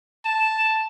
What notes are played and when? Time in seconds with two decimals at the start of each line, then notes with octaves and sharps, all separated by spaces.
0.25 A5 E7